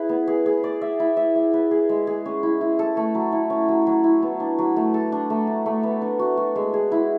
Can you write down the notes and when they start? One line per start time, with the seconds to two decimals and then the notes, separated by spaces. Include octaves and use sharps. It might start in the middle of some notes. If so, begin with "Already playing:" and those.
Already playing: E4 G#4 B4
0.09 B3
0.27 G#4
0.46 G#4
0.64 D5
0.81 E5
1.00 E4
1.17 E5
1.35 E5
1.53 B4
1.71 G#4
1.89 G#3
2.07 G#4
2.26 C#4
2.43 E4
2.61 E4
2.79 A4
2.97 A3
3.15 F#3
3.32 E4
3.50 C#4
3.68 F#3
3.87 F#3
4.04 E4
4.22 B3
4.40 D4
4.59 F#3
4.76 A3
4.94 A4
5.12 D4
5.30 A3
5.47 D4
5.66 A3
5.83 B3
6.02 D4
6.19 F#4
6.37 F#4
6.56 G#3
6.74 G#4
6.92 E4